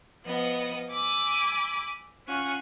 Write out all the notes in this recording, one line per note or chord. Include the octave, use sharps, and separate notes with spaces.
F3 B3 D#5
G#5 B5 D6 E6
C#4 F4 F#5 G#5 C#6